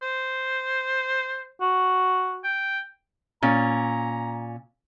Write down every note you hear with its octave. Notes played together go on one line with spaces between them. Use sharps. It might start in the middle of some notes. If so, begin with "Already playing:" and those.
C5
F#4
G5
A#2 C#4 A#5